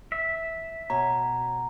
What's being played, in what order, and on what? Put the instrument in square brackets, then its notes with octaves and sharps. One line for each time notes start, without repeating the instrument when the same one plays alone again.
[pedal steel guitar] E5
[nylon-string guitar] B2 C#5 [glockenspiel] A#5